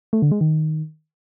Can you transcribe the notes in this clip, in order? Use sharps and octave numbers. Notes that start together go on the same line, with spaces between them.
A3
D3
G#3
D#3